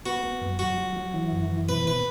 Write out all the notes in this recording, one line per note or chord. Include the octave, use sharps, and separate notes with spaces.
B3 F#4
B3
F#2
F#3 F#4
F#3
F#3
E3
F#2
E3
B2 B4
B2 B4